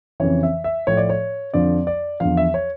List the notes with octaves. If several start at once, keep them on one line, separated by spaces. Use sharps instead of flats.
F2 C#3 E3 C#5
E5
E5
A2 F3 C#5
D5
C#5
F2 D3 F3 D5
D5
E2 D3 F3 F5
E5
C#5